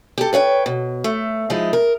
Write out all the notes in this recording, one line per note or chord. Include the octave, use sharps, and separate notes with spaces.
G4 A4
B4 C#5 F#5 G5
B2
A3
F3 G#3 D#4 E4
A#4